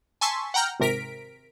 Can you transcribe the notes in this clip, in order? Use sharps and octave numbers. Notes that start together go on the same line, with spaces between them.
G#5 A5 C6 C#6 E6 B6
F#5 G5 A#5 F6 G6
G#1 C3 A#4 B6 D7